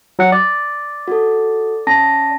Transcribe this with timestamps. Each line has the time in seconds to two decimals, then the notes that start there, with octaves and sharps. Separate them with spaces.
0.19 F#3 F#5
0.32 D5
1.08 F#4 A4
1.87 C#4 A5 A#6